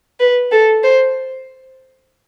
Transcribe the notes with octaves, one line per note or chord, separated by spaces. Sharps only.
B4
A4
C5